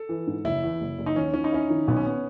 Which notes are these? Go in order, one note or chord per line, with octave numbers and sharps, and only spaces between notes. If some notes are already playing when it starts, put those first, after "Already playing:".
Already playing: A4
E3
G#2
F#1 E4
E2
F#1
F#1
D#4
D#2 C#4
D#3 C#4
D#4
C#4 E4
D#3
B1 B3
C#4
B3